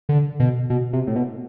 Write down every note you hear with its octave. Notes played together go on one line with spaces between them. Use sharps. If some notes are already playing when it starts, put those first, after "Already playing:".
D3
B2
B2
C3
A2
B2